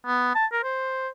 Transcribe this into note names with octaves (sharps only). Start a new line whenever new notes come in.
B3
A5
A#4
C5